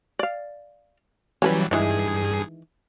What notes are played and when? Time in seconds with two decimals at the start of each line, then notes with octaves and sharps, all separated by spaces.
0.19 D5 F5
1.42 E3 F#3 G3 C#4 A4 B4
1.71 G2 D#3 E3 G#3 G#4